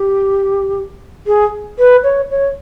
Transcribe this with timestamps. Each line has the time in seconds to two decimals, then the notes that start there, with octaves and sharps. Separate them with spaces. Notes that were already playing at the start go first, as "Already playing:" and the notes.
Already playing: G4
1.27 G#4
1.79 B4
2.04 C#5
2.30 C#5